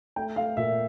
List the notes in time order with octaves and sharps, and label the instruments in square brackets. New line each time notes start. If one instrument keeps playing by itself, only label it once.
[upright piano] A3 G5
A3 F5
A#2 E5